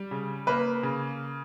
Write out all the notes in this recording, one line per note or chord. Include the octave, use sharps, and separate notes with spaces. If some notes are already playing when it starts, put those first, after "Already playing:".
Already playing: G3
C#3
A#3 B4
C#3